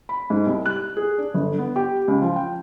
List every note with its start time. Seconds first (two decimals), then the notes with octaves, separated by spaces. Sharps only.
0.09 B5
0.30 G#2
0.46 C2
0.66 F#6
0.97 G#4
1.18 D4
1.34 G1
1.59 B3
1.76 G4
2.08 C#2
2.21 F3
2.36 G5